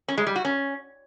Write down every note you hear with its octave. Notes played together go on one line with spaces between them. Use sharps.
C#4
G#3
G3
F#4
C#4